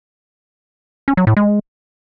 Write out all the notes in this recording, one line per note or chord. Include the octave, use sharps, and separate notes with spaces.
C#4
F#3
A2
G#3